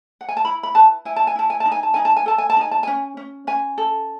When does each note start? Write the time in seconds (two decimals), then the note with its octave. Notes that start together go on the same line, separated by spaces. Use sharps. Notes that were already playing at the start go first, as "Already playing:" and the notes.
0.21 F#5
0.29 G#5
0.37 A5
0.45 E4 B5
0.63 B5
0.75 B4 A5
1.05 E4 G#5
1.16 A5
1.27 G#5
1.36 E4 A5
1.50 G#5
1.60 A5
1.66 D#4
1.72 G#5
1.83 A5
1.94 D#4 G#5
2.05 A5
2.16 G#5
2.26 A4 A5
2.38 G#5
2.50 A5
2.57 D#4 G#5
2.71 A5
2.83 C#4 G#5
3.17 C#4
3.47 C#4 G#5
3.78 A4